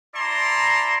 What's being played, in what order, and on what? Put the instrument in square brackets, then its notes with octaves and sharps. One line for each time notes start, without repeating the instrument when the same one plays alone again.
[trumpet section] E4 D5 A5 A#5 C6